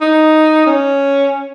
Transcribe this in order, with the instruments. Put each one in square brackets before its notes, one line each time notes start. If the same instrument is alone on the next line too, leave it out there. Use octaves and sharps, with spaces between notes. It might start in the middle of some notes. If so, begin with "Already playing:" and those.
[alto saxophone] D#4
C#4